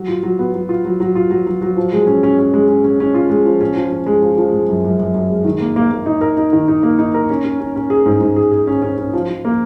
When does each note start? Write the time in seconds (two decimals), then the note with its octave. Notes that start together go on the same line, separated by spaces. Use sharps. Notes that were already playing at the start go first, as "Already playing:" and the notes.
Already playing: F#3
0.08 F4
0.23 F#3
0.39 B3
0.54 F#3
0.69 F4
0.85 F#3
1.00 F#3
1.15 F4
1.30 F#3
1.47 F#3
1.62 F#3
1.77 F3
1.93 G#3
2.07 C#4
2.23 C#4
2.39 C#4
2.54 G#3
2.68 C#4
2.84 C#4
3.00 C#4
3.14 F4
3.30 G#3
3.45 F3
3.61 C#4
3.76 F3
3.92 C#4
4.06 G#3
4.22 F3
4.37 F3
4.52 G#3
4.69 F#2
4.84 F#2
4.99 F#2
5.14 F#2
5.30 G#3
5.45 D#3
5.60 A#3
5.76 A#3
5.91 A#3
6.06 D#4
6.21 A#4
6.37 D#4
6.53 D#3
6.68 D#4
6.83 A#3
6.99 D#4
7.14 A#4
7.30 C#4
7.44 C#4
7.60 C#4
7.76 C#4
7.90 G#4
8.06 G#2
8.21 G#2
8.36 G#4
8.52 G#4
8.67 C#4
8.82 C#4
8.98 C#4
9.13 F3
9.29 F3
9.45 A#3